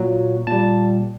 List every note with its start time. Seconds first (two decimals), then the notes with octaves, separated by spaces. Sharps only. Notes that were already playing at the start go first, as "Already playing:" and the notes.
Already playing: A#2 F#3
0.47 A#2 G3 A5